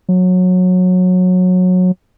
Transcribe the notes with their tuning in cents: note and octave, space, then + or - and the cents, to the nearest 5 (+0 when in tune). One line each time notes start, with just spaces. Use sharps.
F#3 -20